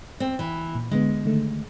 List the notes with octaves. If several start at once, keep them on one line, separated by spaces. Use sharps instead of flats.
C4
E3
A#2
D3 G#3 B3
D3 D#3 A3